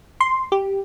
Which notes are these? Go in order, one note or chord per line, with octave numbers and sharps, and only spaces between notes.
C6
G4